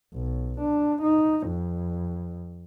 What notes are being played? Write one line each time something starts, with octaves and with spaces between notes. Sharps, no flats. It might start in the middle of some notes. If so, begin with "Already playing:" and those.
B1
D4
D#4
F2